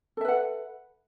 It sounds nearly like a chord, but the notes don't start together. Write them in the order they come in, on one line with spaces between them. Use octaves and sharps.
A4 E5 B4 F#5